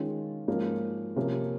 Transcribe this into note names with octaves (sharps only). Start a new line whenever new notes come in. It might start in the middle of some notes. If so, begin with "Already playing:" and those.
Already playing: D#3 G#3 C#4 F4
G#2 F3 A#3 C#4
C3 F3 A#3 C#4